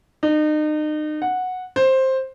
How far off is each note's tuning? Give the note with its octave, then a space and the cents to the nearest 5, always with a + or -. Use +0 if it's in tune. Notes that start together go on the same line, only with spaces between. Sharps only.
D#4 -35
F#5 -10
C5 +10